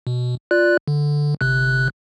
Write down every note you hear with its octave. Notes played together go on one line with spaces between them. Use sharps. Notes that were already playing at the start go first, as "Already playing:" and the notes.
B2
F4 D5 F#6
D3
G1 C3 F#6